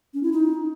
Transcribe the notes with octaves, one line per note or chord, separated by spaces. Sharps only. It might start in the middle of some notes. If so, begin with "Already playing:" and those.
C#4
E4
D#4